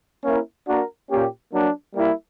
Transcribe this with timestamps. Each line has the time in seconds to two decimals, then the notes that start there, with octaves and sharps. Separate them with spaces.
0.23 A#3 C#4 E4 A#4
0.67 A#3 D4 F#4 A#4
1.10 A#2 A#3 C#4 G4
1.53 F#3 A#3 D4
1.95 G3 A#3 E4